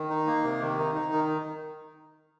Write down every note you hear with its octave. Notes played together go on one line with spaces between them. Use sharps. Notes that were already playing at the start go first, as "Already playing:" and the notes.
Already playing: D#3
D#4
A#3
C3
D#3
D#4
D#4
D#3